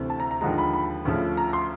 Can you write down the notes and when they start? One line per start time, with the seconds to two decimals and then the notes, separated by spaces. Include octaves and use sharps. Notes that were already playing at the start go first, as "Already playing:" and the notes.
Already playing: D2 C3 E3 A3 C4
0.10 A5
0.20 A#5
0.31 A#5
0.41 D#2 D3 F3 G#3 A#5
0.58 B5
0.73 B5
1.05 D2 C#3 F3 A3
1.37 A#5
1.53 C6